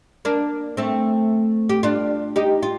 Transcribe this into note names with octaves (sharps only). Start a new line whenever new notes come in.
A#3 D4
A3 C4
G4
D4 F4
D#4 G4
F4